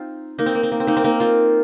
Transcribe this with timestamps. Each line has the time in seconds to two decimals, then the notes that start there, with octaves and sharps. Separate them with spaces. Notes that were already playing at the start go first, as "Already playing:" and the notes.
Already playing: C4 D#4 F4
0.38 A#3 D#4
0.46 C4
0.55 A#3
0.63 C4
0.72 A#3
0.80 C4
0.87 A#3 D#4
0.97 C4
1.04 A#3 D#4
1.20 C4 F4